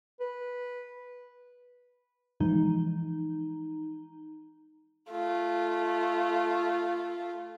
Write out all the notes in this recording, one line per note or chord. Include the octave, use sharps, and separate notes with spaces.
B4
E3 F3 G#3 D#4
A3 F4